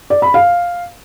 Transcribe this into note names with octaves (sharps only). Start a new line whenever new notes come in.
D5
B5
F5